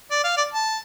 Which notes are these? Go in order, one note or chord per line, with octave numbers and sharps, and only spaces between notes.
D5
F5
D5
A5